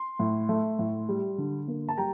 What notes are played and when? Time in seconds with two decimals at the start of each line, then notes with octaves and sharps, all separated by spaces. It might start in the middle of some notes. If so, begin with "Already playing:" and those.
Already playing: C6
0.19 A2
0.49 A3
0.79 A2
1.09 G3
1.38 D3
1.68 A#3
1.89 A5
1.97 G3 G5 A#5